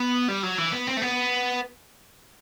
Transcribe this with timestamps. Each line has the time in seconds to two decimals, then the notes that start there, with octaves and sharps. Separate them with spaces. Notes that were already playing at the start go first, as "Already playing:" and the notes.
Already playing: B3
0.28 G3
0.43 F#3
0.58 E3
0.73 B3
0.87 C4
0.97 A3
1.02 B3